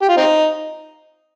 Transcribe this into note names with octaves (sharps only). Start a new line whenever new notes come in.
G4
F4
C4 D#4